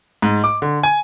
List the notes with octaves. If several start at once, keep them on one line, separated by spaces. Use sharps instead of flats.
G#2
D6
D3
G#5